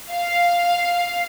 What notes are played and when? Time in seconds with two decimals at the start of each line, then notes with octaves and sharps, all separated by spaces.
0.11 F5